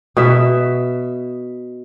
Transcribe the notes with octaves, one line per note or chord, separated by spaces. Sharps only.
B2 E5